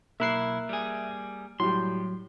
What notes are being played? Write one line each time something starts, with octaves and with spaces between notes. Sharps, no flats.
B1 A#3 E4 E5 F#6 C7
G3 G#4
A2 F#3 G3 C6